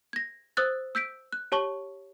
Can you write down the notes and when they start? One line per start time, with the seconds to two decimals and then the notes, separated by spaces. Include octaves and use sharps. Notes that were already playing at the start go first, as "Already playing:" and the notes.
0.13 G#6 A#6
0.57 C5 D#6 E6 F#6 A6
0.95 E6 G6 B6 D7
1.32 F#6
1.52 G4 C#5 A5 C#6 G7